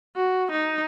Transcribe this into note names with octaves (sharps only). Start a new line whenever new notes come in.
F#4
D#4